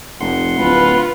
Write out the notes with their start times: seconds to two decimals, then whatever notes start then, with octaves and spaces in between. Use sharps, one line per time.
0.21 F1 F#5 C6
0.58 D1 F4 B4